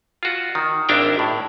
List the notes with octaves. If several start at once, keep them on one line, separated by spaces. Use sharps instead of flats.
F4 F#4
D#3
G#1 D4 E4 A#4 F5 G5
A2